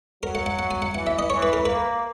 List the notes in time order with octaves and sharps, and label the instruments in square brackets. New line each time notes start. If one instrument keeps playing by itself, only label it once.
[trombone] F#3 [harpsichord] A#4
[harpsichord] F#5
F#5
F#5
G#5
F#5
[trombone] E3 [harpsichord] F#5
[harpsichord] E5
D#5
[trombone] E3 [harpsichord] C#5
[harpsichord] B4
A#4
[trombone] A#3 [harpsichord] B4